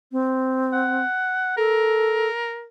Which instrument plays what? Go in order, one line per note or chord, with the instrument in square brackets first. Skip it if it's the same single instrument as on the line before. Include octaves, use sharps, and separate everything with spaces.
[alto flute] C4
[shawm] F#5
[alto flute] A4 [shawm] A#4